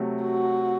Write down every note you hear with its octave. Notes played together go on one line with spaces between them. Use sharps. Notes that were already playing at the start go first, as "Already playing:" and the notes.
Already playing: C3 F#3 A3
F#4